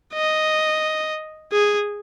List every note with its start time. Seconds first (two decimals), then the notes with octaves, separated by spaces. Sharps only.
0.14 D#5
1.52 G#4